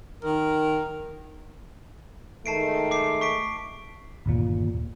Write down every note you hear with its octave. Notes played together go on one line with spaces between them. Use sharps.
D#3 A#4
D#3 G#3 A3 A5 C7 D7
D6 C7
C#6 B6 D7
G1 D#2 A#2